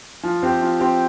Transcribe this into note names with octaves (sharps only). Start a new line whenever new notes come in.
F3
C4 G4
F3
C4 G4